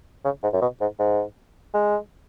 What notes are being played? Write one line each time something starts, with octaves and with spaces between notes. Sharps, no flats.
C#3
G#2
F#2
B2
G#2
G#2
G#3